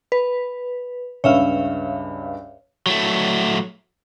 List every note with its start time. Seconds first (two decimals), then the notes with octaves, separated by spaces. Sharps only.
0.12 B4
1.24 C#2 G2 C#5 E5 F5
2.86 F#3 A3